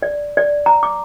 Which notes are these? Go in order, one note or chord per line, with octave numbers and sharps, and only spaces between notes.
D5
D5
A#5
D6